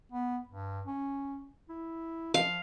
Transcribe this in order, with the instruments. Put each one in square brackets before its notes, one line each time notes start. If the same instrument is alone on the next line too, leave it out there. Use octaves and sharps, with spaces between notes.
[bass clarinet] B3
G2
C#4
E4
[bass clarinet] F3 [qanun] F5